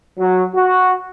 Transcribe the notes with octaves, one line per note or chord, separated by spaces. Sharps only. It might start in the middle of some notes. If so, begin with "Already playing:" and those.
F#3
F#4